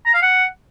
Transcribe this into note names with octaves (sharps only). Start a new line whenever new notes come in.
A#5
F5
F#5